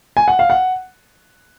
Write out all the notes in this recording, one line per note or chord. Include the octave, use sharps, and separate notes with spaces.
G#5
F#5
F5
F#5